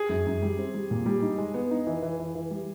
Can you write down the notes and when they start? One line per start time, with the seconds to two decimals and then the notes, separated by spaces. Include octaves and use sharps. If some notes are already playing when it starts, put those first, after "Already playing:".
Already playing: G#4
0.09 F#2
0.26 F#2
0.42 G3
0.59 C4
0.74 G3
0.91 A#2
1.06 G3
1.22 D#4
1.38 G#3
1.54 B3
1.71 D#4
1.87 E3
2.02 E3
2.19 E3
2.35 E3
2.51 G3